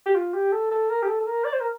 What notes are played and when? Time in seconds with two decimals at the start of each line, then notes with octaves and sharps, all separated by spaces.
0.06 G4
0.15 F4
0.34 G4
0.52 A4
0.72 A4
0.90 A#4
1.03 G4
1.08 A4
1.21 A4
1.27 A#4
1.45 D5
1.53 C5
1.61 A#4